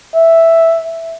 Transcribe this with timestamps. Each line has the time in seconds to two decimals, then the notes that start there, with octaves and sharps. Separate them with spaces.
0.15 E5